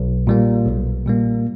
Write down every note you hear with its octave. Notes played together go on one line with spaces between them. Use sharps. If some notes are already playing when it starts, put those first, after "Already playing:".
Already playing: B1
A#2 G3 A#3
B1
A#2 G3 A#3